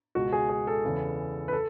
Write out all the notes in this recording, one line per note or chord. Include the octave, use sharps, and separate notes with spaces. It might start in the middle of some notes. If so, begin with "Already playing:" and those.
C#2 B2 F#4
G#4
G#4
A4
E2 C#3 E3
B4
A4